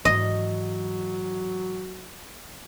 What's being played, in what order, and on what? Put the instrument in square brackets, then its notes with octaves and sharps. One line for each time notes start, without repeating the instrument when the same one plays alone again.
[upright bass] G#2 E3 [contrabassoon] F#3 [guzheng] D#5